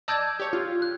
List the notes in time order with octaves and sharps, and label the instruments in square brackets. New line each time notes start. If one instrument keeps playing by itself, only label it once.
[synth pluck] D5 D#5 A5 [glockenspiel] E6 G6 G#6
[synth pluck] G4 C#5
F4
[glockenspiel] F#6